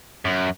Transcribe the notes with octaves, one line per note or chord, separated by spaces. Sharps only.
F#2